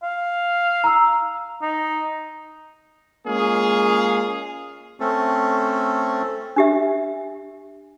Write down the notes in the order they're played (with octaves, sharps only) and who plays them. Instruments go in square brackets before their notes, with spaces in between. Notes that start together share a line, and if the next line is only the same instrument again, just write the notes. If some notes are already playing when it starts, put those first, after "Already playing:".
[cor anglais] F5
[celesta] A#5 E6
[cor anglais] D#4
[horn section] G#3 A#3 C#4 F4 G#4 F5
[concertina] A3 C4 C#4 A4
[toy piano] D4 G4 E5